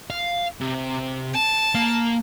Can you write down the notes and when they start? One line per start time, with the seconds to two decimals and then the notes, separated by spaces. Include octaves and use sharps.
0.10 F5
0.61 C3
1.34 A5
1.75 A#3